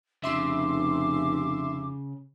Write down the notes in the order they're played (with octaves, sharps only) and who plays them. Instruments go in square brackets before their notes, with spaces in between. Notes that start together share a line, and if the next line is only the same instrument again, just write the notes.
[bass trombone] F1 [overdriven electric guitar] C#3 [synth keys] E5 C6 [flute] D6